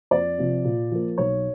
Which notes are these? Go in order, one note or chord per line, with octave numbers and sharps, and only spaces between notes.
F2 D5
C3 F3
A#2
F3 A#3
B1 C#5